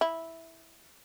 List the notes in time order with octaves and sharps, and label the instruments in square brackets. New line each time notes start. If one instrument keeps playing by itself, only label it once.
[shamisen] E4